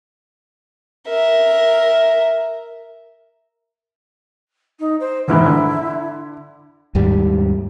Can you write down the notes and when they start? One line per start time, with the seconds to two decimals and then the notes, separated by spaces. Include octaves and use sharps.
1.07 A#4 E5
4.79 D#4
5.00 C5
5.28 F1 G#2 E3 E4
5.46 D3
6.95 D#2 G#2 G3